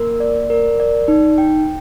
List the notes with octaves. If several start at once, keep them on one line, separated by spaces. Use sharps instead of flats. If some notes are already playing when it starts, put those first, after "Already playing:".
Already playing: A#3 A#4
D5
A#4
D5
D#4
G5